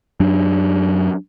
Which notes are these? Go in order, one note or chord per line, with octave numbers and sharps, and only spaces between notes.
F#2 F#3 D4